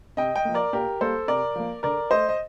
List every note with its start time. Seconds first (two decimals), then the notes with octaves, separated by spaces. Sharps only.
0.17 C3 D#5 G5
0.36 D#5 G5
0.45 F3 A#3
0.54 A#4 D5
0.73 A#2 G4 A#4
1.00 G3 A#3 A4 C5
1.28 C3 A#4 D5
1.55 F3 A#3
1.83 D3 A#4 D5
2.11 A3 C5 D#5
2.29 D#5